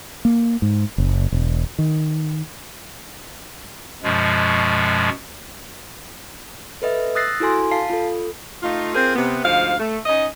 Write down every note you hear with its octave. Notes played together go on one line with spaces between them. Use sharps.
A#3
G#2
F#1
E1
D#3
F#2 B2 F3 G#3
A4 B4 D#5 E5
D#6 E6 F#6 A6 A#6 C7
E4 F#4 A4 G#5 C6
F5 A5 C7
F4 A4
A3 D#4 F4
C4 F4 G#4 A#4 C5
C3 B3
D2 G#2 F3 F5
A3
C#4 D#4 D#5